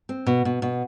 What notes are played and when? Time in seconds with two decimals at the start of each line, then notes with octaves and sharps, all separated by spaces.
0.09 C4
0.26 B2
0.45 B2
0.62 B2